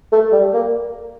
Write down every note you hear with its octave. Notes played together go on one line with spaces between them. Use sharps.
A3
G3
A#3